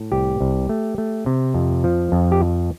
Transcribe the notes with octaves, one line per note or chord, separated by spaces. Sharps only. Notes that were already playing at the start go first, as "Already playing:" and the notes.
Already playing: A2
C2 G4
C2
A3
A3
C3
F2
F3
F2
G4